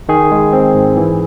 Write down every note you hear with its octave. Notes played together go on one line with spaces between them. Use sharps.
D#3 G#4
G#3
C4
G#2
E3